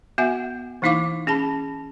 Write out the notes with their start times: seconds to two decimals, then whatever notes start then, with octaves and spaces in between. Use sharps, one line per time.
0.18 B3 F#4 E5 F#5 G#5
0.82 E3 A#3 D#4 E4 F5 D6
1.27 C#4 G#4 A5 B5